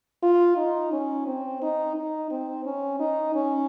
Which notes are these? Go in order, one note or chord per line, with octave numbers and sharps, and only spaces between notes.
F4
D#4
C#4
C4
D#4
D#4
C4
C#4
D#4
C#4